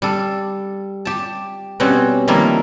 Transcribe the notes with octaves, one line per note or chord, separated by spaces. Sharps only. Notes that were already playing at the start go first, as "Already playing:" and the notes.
G3 D4 A4
G4 A5
B2 G3 C4 C#4 F#4
D#3 F3 G3 A#3 E4 A#4